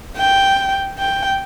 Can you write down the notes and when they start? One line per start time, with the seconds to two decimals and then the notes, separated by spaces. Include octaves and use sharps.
0.17 G5
0.98 G5